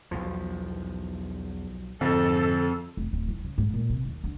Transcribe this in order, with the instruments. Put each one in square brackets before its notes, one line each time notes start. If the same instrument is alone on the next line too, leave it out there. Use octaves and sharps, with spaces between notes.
[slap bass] B1 F3 [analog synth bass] E2
[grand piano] F2 [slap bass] G#2 [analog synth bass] D3 [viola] A4
[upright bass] F1
D1
E3
C#3
G#2
A#2
C3
D#2
D3